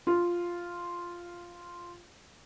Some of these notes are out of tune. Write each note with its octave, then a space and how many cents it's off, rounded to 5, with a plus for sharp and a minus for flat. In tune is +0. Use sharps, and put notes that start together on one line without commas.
F4 +0